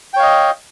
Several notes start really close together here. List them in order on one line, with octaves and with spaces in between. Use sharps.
G5 C#5 F5 D#5